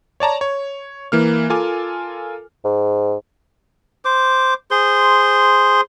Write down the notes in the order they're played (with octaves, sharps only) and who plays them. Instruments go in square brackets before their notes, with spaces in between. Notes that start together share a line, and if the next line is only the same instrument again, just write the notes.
[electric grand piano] C#5 D5 A5 A#5
C#5
E3 A#3 F6
F4 A4 A#4 G#5 D6 F6
[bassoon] G#2
[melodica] C5 D6
G#4 C5 C6